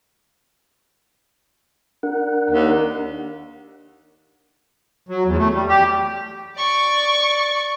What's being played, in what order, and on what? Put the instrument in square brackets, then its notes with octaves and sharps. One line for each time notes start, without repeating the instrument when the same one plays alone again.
[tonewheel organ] D4 A#4 F#5
[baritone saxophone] D#2
[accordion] F#3
E2
A3
G3
G4
[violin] D5 C#6